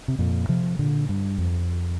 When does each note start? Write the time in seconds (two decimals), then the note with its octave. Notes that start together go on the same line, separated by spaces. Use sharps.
0.08 C3
0.19 F2 A#2
0.49 C3 F3
0.79 A#2 D3
1.09 G2
1.38 F2